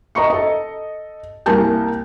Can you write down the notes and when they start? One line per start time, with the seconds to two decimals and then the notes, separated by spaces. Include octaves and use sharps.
0.15 D#5 A#5 C#6 C#7
0.30 A4 D#5
1.46 C2 A#3 A#4 G#5 A5 G6